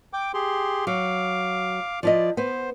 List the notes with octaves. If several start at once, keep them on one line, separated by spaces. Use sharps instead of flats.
G5 D6
G4 G#4 C6
F#3 F5 D6
F3 E4 D5 D#5
B3 C5